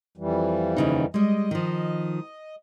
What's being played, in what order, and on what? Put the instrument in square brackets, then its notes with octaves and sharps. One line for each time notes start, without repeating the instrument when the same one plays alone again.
[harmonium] F2 E3 G3
[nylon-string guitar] D#2 C#3 D#4
[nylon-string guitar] G3 G#3 [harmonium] D#5
[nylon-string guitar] D#3 F3